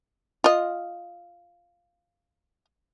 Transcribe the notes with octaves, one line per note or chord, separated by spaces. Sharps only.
F4 D#5